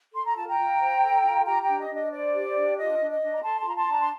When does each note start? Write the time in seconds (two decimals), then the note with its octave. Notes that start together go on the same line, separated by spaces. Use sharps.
0.14 A4 C6
0.26 A#5
0.36 F4 A5
0.47 G5 A#5
0.58 F4
0.80 C5
1.02 A4
1.24 F4
1.45 G4 G5 A#5
1.62 G5 A#5
1.68 D4
1.78 D#5
1.89 D4
1.94 D#5
2.11 C5 D5
2.33 G4
2.55 D4
2.77 F4 D#5
2.99 D4
3.10 D#5
3.21 D4
3.34 A#5
3.43 A4 A5 C6
3.60 A5
3.64 F4 A#5
3.76 A5 C6
3.86 D4
3.92 A#5
4.00 C6